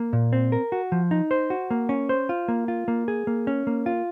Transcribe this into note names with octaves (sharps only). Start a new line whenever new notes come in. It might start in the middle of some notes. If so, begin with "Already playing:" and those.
Already playing: A#3
A#2
C4
A#4
F#4
F3
D#4
C5
F#4
A#3
C#4
C5
F4
A#3
F4
A#3
G#4
A#3
C#4
A#3
F4